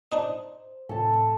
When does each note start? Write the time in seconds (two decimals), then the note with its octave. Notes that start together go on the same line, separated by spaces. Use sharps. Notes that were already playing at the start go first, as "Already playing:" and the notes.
0.12 D4 D#4 C5 D#5
0.89 A2 C3 A4 A5